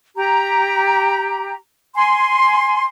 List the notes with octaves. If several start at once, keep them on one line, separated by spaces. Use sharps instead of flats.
G4 A#5
G#5 C6